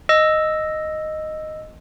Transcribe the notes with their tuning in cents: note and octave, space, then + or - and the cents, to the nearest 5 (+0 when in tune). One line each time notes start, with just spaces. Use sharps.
D#5 +0 E6 +0